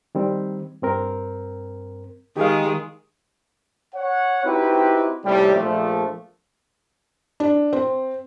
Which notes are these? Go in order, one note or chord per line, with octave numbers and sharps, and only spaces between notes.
D#3 G3 C4
G2 C4 A#4
D#3 G#3 G4 G#4 F5
C#5 F#5
C4 D#4 E4 F#4 G4 B4
D#2 A2 C3 G3
A#1 F3 A3
D4
C4